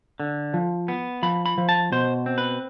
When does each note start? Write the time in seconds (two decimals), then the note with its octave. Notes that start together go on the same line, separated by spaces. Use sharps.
0.20 D3
0.54 F3
0.88 B3
1.23 F3 B5
1.46 B5
1.58 F3
1.69 A5
1.92 B2 C5
2.26 C4
2.38 B4